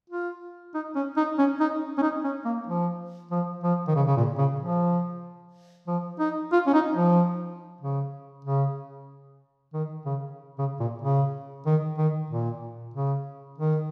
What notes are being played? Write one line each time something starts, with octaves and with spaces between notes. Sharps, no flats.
F4
D#4
C#4
D#4
C#4
D#4
C#4
D#4
C#4
A#3
F3
F3
F3
D#3
C#3
C#3
A#2
C#3
F3
F3
D#4
F4
C#4
D#4
F3
C#3
C#3
D#3
C#3
C#3
A#2
C#3
D#3
D#3
A#2
C#3
D#3